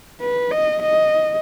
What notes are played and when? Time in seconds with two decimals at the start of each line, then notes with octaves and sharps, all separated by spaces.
0.21 B4
0.52 D#5
0.83 D#5